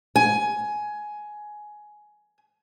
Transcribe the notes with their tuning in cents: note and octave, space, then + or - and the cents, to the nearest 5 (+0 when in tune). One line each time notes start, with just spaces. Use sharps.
G#5 +15